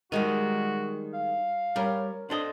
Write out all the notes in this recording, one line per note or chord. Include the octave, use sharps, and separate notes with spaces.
D#3 G3 G#3 D#4 F#4
F5
G3 C#4 A#4
D4 A4 C5 D#5